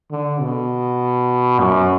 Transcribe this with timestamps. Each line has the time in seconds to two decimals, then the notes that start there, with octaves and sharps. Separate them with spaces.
0.11 D3
0.41 B2
1.60 F#2